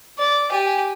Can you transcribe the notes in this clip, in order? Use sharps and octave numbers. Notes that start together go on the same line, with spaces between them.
D5
G4 G#5